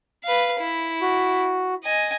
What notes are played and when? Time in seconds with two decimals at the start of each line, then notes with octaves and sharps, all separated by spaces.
0.24 B4 F5
0.60 E4
1.01 F#4
1.84 D#5 G#5